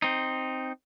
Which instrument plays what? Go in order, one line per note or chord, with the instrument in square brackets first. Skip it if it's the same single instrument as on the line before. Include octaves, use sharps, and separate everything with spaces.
[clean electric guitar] C4 D#4